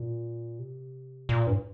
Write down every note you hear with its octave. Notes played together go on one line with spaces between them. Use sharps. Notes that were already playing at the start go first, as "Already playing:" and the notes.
Already playing: A#2
C3
A#2
G2